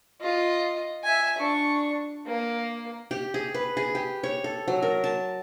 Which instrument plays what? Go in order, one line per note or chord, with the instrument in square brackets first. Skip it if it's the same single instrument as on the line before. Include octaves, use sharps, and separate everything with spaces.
[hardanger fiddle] F4 D#5
E5 G#5
D4 C#6
A#3
[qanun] G4
G#4
B4
G#4
G4
C#5
A4
F#3
A#4
A5